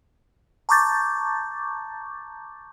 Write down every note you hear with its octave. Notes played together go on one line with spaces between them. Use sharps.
A5 A#5 C#6 D6 G6 A6